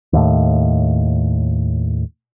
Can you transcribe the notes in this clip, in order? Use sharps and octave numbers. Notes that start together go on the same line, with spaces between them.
D#2 A2